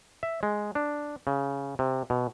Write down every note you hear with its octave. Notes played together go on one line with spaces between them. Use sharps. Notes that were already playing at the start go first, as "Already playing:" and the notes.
E5
G#3
D4
C#3
C3
B2